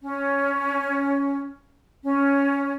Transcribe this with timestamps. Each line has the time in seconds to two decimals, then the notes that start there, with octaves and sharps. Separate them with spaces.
0.02 C#4
2.03 C#4